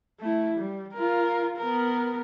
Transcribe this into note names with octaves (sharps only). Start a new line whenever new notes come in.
A3 E4
G3
F4 A#4
B3 A#4